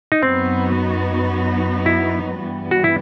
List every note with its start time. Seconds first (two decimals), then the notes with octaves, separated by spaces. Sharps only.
0.12 D#4
0.22 F#2 F#3 B3 C4 D#4 F#4
1.86 E4
2.40 G2 E3 G3 B3
2.71 F#4
2.84 E4